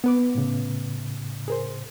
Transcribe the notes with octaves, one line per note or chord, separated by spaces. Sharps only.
B3 B4 D6
A2 C#3
G#4 A#4 C5